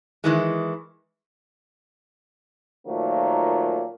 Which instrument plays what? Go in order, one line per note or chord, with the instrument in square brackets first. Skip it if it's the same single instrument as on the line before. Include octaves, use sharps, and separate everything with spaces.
[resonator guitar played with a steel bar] D#3 E3 G#3
[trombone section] A#2 D#3 F3 F#3 A3 A#3